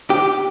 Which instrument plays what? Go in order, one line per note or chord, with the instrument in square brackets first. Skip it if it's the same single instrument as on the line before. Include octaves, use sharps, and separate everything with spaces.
[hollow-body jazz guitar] G4